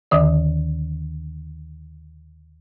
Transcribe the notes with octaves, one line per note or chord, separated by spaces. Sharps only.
D#2 D3 D#3 D5